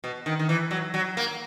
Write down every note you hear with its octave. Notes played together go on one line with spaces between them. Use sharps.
B2
D#3
D#3
E3
F#3
F#3
A#3